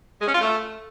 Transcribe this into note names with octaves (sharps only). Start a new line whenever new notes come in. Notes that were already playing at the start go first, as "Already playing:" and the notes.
G#3
C#4
F4
A3